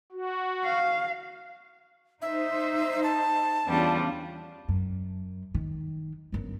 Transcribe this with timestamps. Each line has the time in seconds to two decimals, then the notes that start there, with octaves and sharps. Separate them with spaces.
0.12 F#4
0.64 F5
2.22 D#4 C5 E5
3.04 A5
3.66 E2 C#3 G3 C#4 D4 F4
4.69 F#2
5.54 D#3
6.32 G1 F#2